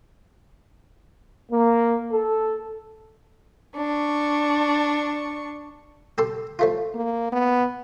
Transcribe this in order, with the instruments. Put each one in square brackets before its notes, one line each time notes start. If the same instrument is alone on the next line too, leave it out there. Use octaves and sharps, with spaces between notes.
[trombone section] A#3
A4
[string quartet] D4 C#6
[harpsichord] G4 A4 C6
F3 A3 F4
[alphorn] A#3
B3